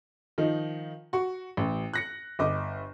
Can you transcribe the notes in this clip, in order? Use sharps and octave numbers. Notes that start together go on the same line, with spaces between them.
D#3 F3 D#4
F#4 C#6
A1
F#6 A#6 C#7
G1 D#5 D6